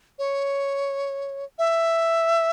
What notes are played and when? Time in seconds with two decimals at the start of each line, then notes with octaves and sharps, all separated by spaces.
0.19 C#5
1.58 E5